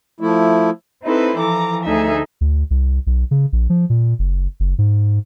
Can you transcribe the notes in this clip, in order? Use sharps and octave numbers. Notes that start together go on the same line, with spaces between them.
F3 A3 E4
C4 D#4 E4 A4 B4 C5
E3 F3 A4 A#5 D6
D2 D3 D#4 G#4 A4 E5
D2
C2
B1
C#3
A#1
F3
A#2
F#1
F#1
G#2